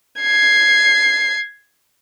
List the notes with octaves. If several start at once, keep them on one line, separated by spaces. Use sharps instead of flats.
G#6 C7